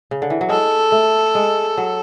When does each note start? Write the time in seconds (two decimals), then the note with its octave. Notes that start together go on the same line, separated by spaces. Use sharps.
0.11 C#3
0.22 D3
0.30 E3
0.41 F#3
0.49 G#3 A4
0.92 A3
1.35 G#3
1.77 F#3